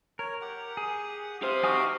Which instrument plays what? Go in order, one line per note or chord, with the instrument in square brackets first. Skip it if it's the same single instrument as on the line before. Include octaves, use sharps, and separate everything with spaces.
[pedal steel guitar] A#4 [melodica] C#5
[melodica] G4 F#5
[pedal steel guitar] G#4
[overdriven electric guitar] G4 C5 [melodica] F5 D#6
[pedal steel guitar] D#4 G#5 D#6 [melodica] F#4 F5